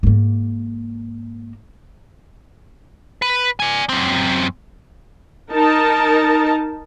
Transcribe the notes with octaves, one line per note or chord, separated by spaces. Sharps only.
G#2 A#3
B4
D5 G#5
F#2 C4
D#4 A#4 A5